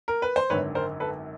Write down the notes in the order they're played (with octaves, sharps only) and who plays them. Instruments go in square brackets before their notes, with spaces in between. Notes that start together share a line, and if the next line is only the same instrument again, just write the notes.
[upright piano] A#4
B4
C5
G#1 F#2 D3 B4 C#5
A#4 C5
A4 B4